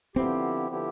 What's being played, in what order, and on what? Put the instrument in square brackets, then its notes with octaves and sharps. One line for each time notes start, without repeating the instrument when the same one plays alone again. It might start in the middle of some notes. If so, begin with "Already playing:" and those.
[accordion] D3 F3 B3 E4 G4 [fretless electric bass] C4
[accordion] D3 F3 B3 E4 G4